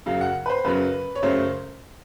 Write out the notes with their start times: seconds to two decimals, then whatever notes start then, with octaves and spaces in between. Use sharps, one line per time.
0.06 F#2 C#3 F#3 F5
0.21 F#5
0.46 B4
0.50 C5
0.64 F#2 C#3 F#3 B4
1.15 C#5
1.23 F#2 C#3 F#3 A3 C5